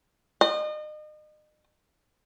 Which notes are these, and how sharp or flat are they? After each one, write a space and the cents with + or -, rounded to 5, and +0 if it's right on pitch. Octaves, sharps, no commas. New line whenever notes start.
D#5 -35